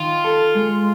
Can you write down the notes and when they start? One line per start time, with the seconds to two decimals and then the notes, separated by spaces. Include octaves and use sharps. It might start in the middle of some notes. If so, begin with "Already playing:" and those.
Already playing: D#3 F4
0.24 A4
0.55 G#3